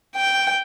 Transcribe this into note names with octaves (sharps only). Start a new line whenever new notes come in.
G5